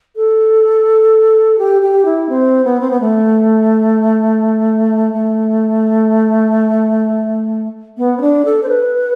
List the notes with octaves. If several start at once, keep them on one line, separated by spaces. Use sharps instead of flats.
A4
G4
G4
E4
C4
B3
C4
B3
A3
A3
B3
C4
D4
A4
C5
B4